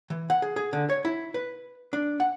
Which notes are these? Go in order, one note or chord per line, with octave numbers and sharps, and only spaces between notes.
E3
F#5
G#4
G#4
D3
C#5
E4
B4
D4
F#5